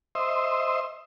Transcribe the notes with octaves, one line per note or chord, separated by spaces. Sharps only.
C5 D#5 E5